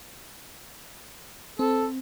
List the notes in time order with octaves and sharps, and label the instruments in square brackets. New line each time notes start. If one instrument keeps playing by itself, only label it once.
[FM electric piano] C4 [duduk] A4